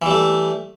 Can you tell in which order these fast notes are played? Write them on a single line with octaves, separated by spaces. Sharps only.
E3 G3 A3